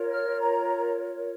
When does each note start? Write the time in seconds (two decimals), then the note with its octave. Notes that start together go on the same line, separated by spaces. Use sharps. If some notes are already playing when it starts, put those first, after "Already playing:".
Already playing: F4 A#4 C#5
0.11 F6
0.40 A#5